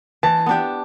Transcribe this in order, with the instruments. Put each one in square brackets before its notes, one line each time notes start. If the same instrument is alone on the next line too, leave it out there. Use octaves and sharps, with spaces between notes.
[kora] E3 [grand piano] A5
[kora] B3 D4 G4